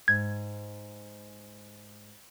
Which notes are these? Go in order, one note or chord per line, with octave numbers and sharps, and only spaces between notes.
G#2 G#6